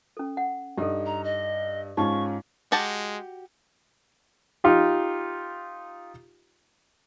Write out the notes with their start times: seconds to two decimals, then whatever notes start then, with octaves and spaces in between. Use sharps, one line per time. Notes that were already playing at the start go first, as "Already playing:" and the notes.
0.17 C#4 A4
0.37 F#5
0.78 G2 D#4 G4 A4
1.06 A#5
1.24 D#5
1.97 G#2 C#4 D#4 F4 G4 C#6
2.72 G#3 F#4 G4 A5
4.64 D#4 F4 G4